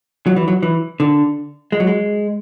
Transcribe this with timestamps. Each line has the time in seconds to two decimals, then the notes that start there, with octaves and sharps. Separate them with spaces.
0.26 F#3
0.36 E3
0.48 F#3
0.63 E3
1.00 D3
1.72 G#3
1.80 F#3
1.87 G#3